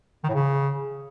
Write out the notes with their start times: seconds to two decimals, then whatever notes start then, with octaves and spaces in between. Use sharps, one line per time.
0.24 D#3
0.29 A2
0.34 C#3